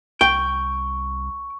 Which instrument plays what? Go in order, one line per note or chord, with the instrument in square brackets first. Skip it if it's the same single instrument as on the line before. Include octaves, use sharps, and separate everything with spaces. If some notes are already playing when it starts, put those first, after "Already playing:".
[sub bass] C2 [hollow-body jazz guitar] G5 [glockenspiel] C#6